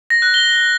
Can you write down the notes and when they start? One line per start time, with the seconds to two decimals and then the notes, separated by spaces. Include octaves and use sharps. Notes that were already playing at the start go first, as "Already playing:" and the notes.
0.10 A#6
0.22 F#6
0.34 G7